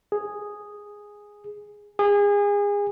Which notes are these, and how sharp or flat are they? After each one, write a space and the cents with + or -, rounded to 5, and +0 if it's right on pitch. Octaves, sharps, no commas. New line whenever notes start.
G#4 -5
G#4 -30